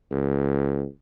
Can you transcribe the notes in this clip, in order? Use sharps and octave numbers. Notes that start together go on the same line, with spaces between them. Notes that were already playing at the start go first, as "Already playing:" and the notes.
C#2